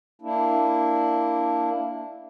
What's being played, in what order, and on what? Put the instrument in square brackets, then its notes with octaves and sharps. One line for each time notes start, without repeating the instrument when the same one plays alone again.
[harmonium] A#3 D4 E4